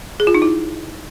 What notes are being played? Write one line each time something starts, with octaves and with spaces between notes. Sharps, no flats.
G#4
F4
D#4
E4